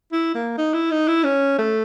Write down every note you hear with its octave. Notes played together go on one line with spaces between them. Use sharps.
E4
A#3
D#4
E4
D#4
E4
C#4
A3